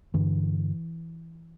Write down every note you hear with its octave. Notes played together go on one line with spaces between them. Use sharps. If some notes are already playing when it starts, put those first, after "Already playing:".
G2 D3 E3